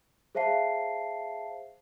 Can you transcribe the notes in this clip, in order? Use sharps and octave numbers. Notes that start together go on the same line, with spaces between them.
G#4 C5 E5 F5 A5 C7